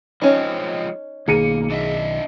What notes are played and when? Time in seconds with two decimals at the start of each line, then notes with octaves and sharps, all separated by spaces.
0.22 F3 G#3 C4 C#4 D#4
1.28 B1 D#3 A#3 G#4 C#7 D#7
1.70 D4 D#5 E5